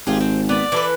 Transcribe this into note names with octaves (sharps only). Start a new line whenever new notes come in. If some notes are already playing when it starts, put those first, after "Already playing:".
G#1 F4 G4 G#4
C4
B3 D5
E3 A4 B4